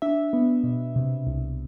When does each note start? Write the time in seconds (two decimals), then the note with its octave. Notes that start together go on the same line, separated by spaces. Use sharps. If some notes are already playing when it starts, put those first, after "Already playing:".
0.02 D4 E5
0.33 B3
0.64 B2
0.96 C3
1.27 C2